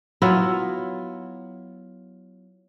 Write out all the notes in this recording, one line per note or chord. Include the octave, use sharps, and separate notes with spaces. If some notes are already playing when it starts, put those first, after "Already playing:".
F#3 B3 E4 F4